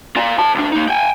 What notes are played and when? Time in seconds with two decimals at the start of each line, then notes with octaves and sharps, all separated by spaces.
0.16 F4 D5
0.38 C#5 A5
0.55 C#2 D4
0.72 A#3 D#4
0.88 G5 G#5